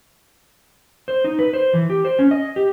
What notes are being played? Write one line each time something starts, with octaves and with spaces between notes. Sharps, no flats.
C5
D#4
B4
C5
E3
G4
C5
C#4
D#5
G4